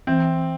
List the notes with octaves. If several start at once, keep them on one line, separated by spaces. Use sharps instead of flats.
E3 C4